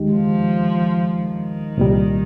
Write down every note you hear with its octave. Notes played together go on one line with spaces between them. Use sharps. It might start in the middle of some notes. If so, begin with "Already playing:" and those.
Already playing: D#2 D#3 G#3 D#4 G4
F3
D#3
C2 A#2 G3